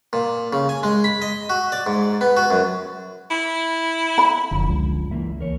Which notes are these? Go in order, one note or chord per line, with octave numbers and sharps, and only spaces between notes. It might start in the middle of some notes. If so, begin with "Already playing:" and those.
A#2
C#3
G#5
G#3
B5
D#5
F#4
D5
G#2
B3
F#4
F#2
E4
B5
F1 F#2 D3 F3
C#2
E3 A#3 E5
E2 A#4 C#5